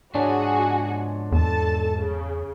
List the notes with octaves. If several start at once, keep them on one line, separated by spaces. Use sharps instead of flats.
G#2 F3 D4 F#4 G#4 C#5 G#5
E2 A4 A5
C#3